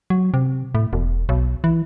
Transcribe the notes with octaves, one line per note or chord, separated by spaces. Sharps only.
F#3
C3
A2
E1
B1
E3